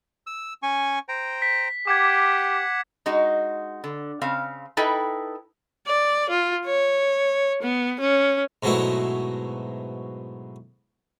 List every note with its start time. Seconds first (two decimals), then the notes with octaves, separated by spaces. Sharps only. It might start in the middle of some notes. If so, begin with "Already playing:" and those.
0.27 E6
0.63 C#4 G#5 C#6
1.09 C5 G5 A#5
1.42 B6
1.87 G4 F#5 D6 G#6
3.06 G#3 D#4 F#4
3.84 D3
4.21 C#3 C4 F5
4.77 D#4 E4 A4 B4 G5
5.87 D5
6.30 F4
6.65 C#5
7.63 B3
8.00 C#4
8.63 G#2 B2 F#3 A3 E4